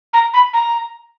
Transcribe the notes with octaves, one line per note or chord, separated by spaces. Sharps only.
A#5
B5
A#5